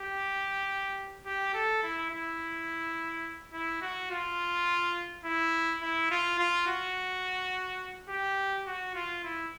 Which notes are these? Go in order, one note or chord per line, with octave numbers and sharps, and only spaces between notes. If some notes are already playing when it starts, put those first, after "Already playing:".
Already playing: G4
G4
A4
E4
E4
E4
F#4
F4
E4
E4
F4
F4
F#4
G4
F#4
F4
E4